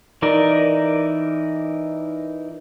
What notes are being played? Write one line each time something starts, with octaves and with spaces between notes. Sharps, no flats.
E3 D#4 A#4 D5